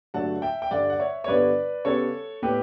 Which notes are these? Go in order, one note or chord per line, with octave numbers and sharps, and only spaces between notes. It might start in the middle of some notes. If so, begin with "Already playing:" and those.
G2 D3 F#3 A3 F#5 A5
E5 G5
G5
G2 D3 G3 D5 F#5
F#5
C#5 E5
C#5
G2 D3 G3 B3 B4 D5
C#3 G3 B3 A4 C#5
A2 G3 B3 G4 B4